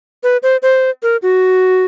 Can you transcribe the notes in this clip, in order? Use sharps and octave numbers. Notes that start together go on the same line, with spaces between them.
B4
C5
C5
A#4
F#4